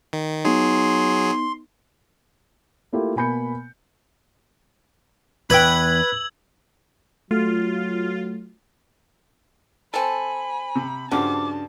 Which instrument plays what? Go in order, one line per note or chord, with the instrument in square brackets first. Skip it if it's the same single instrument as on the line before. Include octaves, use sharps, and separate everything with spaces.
[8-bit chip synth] D#3
[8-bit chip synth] F#3 G#4 [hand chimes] B3 D#4 [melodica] C6
[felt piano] A3 A#3 E4 F4 G4
B2 A#3 G#5 B5 G6 C#7
[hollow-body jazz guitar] E2 G5 [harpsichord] B4 [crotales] E6 G#6 F#7
[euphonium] F#3 [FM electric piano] A3 F#4 [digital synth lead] F4
[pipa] C4 A4 [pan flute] G#5 [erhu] B5
[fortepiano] C3
[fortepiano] G2 C#3 F#4 [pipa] F3 [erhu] A5 [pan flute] D6